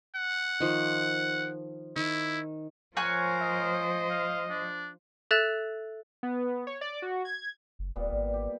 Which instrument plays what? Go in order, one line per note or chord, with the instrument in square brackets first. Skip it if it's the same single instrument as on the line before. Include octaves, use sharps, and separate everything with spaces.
[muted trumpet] F#5
[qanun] D#3 F3
[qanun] D#3 [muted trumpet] E4
[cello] F3 C5 [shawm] A#4 [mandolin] C#5 G#5 F#6
[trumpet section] D#5
[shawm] F5
D4
[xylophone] A4 E5 F#6 A6 E7 F7
[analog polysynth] B3
C#5
D5
F#4
G#6
[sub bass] F#1
[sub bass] D#1 [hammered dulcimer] A#2 G3 B3
[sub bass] G#1
[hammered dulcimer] G4